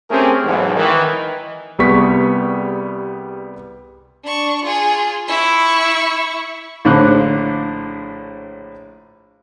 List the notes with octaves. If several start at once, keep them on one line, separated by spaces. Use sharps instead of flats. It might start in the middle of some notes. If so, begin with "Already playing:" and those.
A3 C4 C#4 G4 G#4 A#4
B1 E2 G#2
D#3 E3
C2 G3 B3 G#4 C#6 B6
D4 C#6
F4 G#4
E4 C#6
A#1 A2 D3 C5 D6 F#6